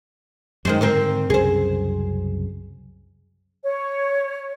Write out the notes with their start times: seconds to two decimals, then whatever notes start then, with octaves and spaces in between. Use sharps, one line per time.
0.65 F#2 D#3 F#3 G#3 C5
0.81 G#2 D3 D#3 C4 A#4 C5
1.30 C2 F#2 C#3 G#4 C5
3.64 C#5